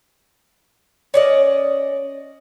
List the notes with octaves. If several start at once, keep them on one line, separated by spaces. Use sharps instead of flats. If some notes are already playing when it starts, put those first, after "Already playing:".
C#4 D5 D#5